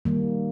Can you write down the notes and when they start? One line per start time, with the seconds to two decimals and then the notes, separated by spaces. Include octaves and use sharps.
0.05 D#3 G3 A#3